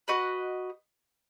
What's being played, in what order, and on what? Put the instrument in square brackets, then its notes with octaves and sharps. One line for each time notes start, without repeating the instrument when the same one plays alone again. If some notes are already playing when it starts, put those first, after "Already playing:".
[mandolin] F#4 B4 D#5